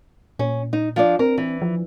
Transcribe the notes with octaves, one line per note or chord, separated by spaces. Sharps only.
A#2 C#4
D#4
F3 D4 D5
C4 A#4
E3
F3